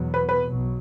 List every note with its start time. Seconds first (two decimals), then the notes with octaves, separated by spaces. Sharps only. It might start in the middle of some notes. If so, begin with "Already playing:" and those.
Already playing: E2 B2 F#3 B3
0.14 B4
0.29 B4
0.44 B1 B2 F#3